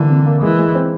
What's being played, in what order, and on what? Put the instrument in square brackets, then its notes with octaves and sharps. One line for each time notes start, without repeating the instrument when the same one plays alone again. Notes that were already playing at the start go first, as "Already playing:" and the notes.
Already playing: [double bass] D3 [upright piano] E3 G3 A#3
[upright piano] C3
A#3
[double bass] E3 [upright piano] G#3
[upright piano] G#3
C4